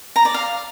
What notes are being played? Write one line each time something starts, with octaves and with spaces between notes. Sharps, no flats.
A#5
D5
F5